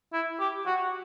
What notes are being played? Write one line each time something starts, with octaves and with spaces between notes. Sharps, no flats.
E4
G4
F#4